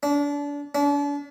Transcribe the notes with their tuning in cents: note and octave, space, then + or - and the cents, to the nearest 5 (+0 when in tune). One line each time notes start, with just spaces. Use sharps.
D4 -30
D4 -40